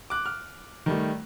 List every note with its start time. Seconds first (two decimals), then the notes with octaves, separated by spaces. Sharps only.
0.10 D6 F#6
0.26 F6
0.86 D#3 G3 A3